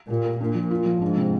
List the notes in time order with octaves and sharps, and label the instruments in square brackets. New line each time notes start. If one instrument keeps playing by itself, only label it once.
[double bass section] A#2 [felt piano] G4
[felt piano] A#4
[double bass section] A#2 [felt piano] D4
[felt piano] F3
F4
F3
[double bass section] G#2 [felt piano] D4
[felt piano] C3